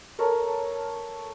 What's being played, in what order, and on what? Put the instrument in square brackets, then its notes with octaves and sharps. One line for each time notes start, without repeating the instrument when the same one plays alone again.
[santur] A4 A#4 C#5